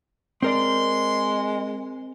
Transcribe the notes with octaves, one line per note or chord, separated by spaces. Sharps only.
G#3 C4 A#4 D5 C6